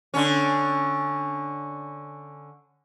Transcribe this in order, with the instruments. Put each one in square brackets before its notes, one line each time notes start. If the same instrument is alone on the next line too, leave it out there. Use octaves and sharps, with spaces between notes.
[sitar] D3 C#4